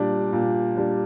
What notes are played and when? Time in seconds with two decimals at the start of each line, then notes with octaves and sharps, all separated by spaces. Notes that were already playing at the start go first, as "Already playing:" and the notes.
Already playing: A#2 G3 D4
0.33 A#2
0.77 G3 D4